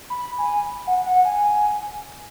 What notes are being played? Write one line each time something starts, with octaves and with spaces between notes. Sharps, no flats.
B5
G#5
F#5
F#5
G#5